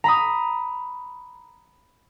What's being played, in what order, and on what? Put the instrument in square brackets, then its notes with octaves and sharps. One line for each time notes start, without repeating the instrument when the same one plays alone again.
[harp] A#5 B5 D#6